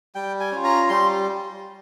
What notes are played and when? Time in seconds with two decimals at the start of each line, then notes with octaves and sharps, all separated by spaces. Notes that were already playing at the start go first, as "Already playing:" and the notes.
0.15 G3 G5
0.40 G#5
0.52 C#4 F4
0.64 A#5
0.89 G3 C6